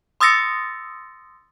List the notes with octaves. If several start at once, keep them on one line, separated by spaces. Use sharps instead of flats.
C6 D#6 E6 A6 A#6 C#7